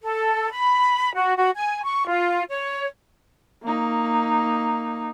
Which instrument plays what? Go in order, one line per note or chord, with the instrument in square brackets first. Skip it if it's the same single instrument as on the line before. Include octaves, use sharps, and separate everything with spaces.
[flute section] A4
B5
F#4
F#4
G#5
C#6
F4
C#5
[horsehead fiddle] A#3 D#4